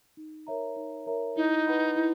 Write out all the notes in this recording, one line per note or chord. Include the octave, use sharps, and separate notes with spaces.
D#4
A#4 C#5 E5 A#5
D#4
A#4 C#5 E5 A#5
D#4 E4
B4 F#5 B5
E4